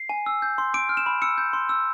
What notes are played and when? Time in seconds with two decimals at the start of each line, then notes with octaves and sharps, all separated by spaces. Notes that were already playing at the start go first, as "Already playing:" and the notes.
Already playing: C7
0.09 G#5
0.26 E6
0.42 G6
0.58 C6
0.74 D6 D7
0.89 F6
0.97 E7
1.06 B5
1.22 E6 C#7
1.38 G6
1.53 C6
1.69 E6